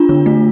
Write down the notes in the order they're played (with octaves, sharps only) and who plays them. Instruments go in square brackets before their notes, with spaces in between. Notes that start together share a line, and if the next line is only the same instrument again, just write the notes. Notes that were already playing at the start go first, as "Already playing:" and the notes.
Already playing: [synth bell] D4 F4
D3
A3